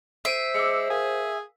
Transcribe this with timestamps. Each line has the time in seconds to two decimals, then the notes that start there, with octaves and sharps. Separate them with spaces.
0.25 C5 E5 C7 D7 D#7
0.54 G#3 D6 E6 C#7
0.90 G#4 A#4 F5